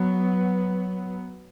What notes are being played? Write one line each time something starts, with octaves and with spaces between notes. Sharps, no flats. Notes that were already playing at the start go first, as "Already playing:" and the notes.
Already playing: F#3 B3